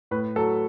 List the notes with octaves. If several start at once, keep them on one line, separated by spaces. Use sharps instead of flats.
A2 B4
F#3 A4